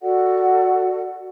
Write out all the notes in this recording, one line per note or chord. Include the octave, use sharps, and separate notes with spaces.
F#4 A4 D5 F#5